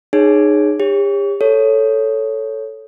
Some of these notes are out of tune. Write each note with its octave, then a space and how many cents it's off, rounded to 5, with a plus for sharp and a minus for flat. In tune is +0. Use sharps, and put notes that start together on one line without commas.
D#4 -30 G#4 +0 C#5 +0
G4 +40 C#5 -5
A4 +0 C#5 +5